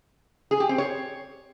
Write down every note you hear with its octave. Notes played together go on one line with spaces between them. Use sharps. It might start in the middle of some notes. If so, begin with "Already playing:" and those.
G#4
G4
C4
C#5